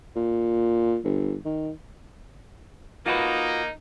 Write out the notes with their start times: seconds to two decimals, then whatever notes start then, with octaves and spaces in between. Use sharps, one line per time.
0.16 A#2
1.04 G1
1.45 D#3
3.06 A#3 D#4 F4 F#4 B4